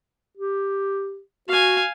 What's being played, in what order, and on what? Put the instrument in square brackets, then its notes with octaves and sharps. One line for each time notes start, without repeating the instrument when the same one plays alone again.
[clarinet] G4
[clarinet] F#4 [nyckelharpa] F5 G#5